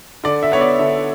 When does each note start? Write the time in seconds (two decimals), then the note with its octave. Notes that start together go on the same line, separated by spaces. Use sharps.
0.24 D3 D5
0.43 E5
0.52 B3 C#5
0.61 D5
0.79 D3 E5